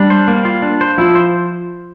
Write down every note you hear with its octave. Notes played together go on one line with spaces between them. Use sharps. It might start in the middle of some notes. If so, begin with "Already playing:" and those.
Already playing: G3 D4
C5
A#3
F4
D4
C5
F3 E4
C5